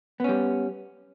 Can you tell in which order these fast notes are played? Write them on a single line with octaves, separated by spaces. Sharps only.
B3 C#4 G3